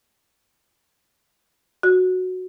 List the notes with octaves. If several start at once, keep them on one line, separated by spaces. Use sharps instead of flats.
F#4